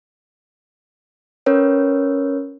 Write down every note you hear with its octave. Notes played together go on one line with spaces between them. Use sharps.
C#4 A#4 B4 C#5